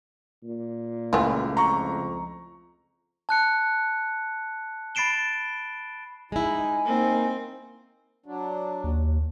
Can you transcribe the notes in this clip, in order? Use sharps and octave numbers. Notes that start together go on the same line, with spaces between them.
A#2
C#2 E3 A3 F4
F2 A#5 C#6
A5 F#6 C#7
B5 A6 C7 D7 E7 G7
G#3 D#4 E4 G#5
A#3 C4 D#4
F#3 D4
D#2